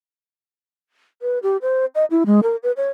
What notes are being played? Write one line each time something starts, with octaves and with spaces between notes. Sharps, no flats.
B4
G4
C5
D#5
E4
G#3
A#4
B4
C#5